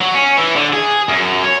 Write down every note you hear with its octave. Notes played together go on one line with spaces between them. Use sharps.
F#3
C#4
E3
D3
G#4
F#2
C#5